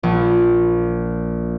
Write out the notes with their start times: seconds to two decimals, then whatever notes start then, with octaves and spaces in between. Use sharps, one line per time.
0.03 A#1